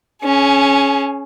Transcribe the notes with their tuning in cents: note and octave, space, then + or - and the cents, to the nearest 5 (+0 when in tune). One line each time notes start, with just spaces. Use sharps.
C#4 +0 G#4 +30